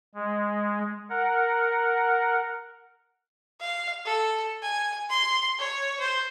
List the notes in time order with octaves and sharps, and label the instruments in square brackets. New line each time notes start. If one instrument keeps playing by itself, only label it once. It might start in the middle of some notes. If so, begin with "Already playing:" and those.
[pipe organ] G#3
A#4 F#5
[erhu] F5
A4
G#5
C6
C#5
C5